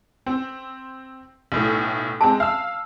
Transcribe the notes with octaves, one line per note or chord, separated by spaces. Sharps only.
C4
B1 A2 A3
G#3 C4 A5
F5 E6